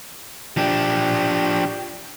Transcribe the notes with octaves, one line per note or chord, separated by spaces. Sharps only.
F3 D4 G4